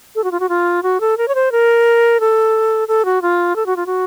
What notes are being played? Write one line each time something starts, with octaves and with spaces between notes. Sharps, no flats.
A4
F#4
F4
F#4
F4
F#4
A4
A#4
C#5
C5
A#4
A4
A4
F#4
F4
A4
F#4
F4
F#4